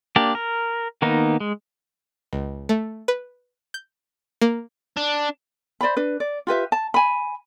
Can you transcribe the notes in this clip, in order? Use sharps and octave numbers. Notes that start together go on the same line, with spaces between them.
A#3 D4 G4 D5
A#4
D#3 A#3 B3 D#4
G#3
C#2
A3
B4
G6
A#3
D4
C5 D5 E5 B5
D4 B4
D5
F4 G4 B4 E5
A5
G#5 B5